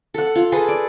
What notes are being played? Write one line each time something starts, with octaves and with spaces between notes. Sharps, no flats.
A4 F#5
F4
G#4 A4 B4
D5